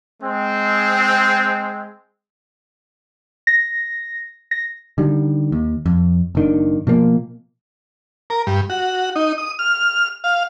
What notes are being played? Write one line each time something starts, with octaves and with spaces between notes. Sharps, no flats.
G#3 C4
A#6
A#6
D3 D#3 G3
D#2
F2
F#1 D#3 D4
B2 F3 A#3
A#4
G2
F#4
D#4
D#6
F6
F5